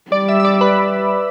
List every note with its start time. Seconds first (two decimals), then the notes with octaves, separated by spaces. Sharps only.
0.11 G3 D5 D6
0.28 E5 E6
0.40 E6
0.45 D5 D6
0.61 B4 B5